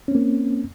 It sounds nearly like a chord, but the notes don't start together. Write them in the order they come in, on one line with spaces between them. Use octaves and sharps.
C#4 C4 A#3